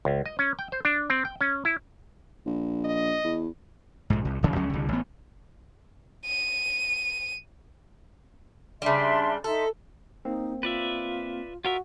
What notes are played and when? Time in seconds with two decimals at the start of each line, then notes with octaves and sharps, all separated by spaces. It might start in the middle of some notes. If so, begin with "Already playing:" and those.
0.05 C#2
0.26 D#5
0.39 C#4
0.59 G5
0.72 C5
0.85 D4
1.10 C4
1.25 G5
1.41 C#4
1.65 E4
2.46 A#1
2.85 D#5
3.24 E2
4.10 A#1 G#2
4.25 C2
4.42 D1 C#3 E3
4.56 C#2 F#3 C#4
4.69 C2 D3
4.89 A1 B3
6.26 D#7
8.82 C#3 G3 D4 E5 C6
9.44 D#4 A4 E5 C6
10.25 A#3 C4 D#4
10.63 F4 B4 D5 E5
11.65 F4 F#4 A#4 E5